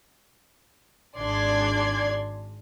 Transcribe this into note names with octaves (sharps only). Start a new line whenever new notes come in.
G#1 D4 G#4 D5 C6 G#6